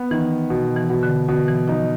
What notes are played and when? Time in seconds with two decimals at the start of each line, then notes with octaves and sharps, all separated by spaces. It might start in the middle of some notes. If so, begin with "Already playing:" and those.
Already playing: B3
0.11 D#3 E3
0.50 B2
0.76 E3
0.90 B2
1.03 D3
1.28 B2 D3
1.48 E3
1.68 F3 D#4